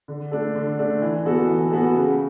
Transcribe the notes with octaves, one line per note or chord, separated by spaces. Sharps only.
D3
A3 D4 A4
D3
A3 D4 A4
E3
B3 F#4 A4
E3
B3 F#4 A4
C#3